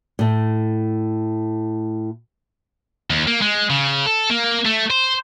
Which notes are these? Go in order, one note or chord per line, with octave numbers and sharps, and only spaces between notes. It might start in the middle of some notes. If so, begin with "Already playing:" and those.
A2 A3
D#2
A#3
G#3
C#3
A4
A#3
A3
C5